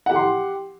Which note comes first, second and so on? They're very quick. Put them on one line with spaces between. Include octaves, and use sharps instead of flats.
F#5 G4 C6